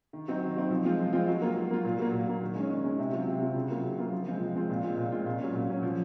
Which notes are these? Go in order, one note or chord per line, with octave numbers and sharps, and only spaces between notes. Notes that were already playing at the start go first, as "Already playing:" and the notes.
D#3
F#3 C4 D#4
D#3
F#3 C4 D#4
F3
G#3 C4 F4
F3
G#3 C4 F4
F#3
A#3 F4
F#3
A#3 F4
A#2
F#3 A#3
A#2
F#3 A#3
D#3
G#3 C#4
D#3
G#3 C#4
C3
F#3 C4 F4
C3
F#3 C4 F4
C#3
F#3 A#3 F4
C#3
F#3 A#3 F4
F3
G#3 C4 F4
F3
G#3 C4 F4
A#2
G#3 C4 F4
A#2
G#3 C4 F4
A#2
F#3 C#4
A#2
F#3 C#4
F3